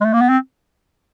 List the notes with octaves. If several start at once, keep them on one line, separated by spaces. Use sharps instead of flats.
G#3
A3
A#3
B3
C4